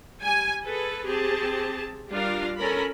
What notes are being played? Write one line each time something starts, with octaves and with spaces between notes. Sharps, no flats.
G3 G#5
G#4 A4 B4
C4 G4 G#4 A5
G3 D4 F4 A#4 F5
C#4 A4 A#4 B5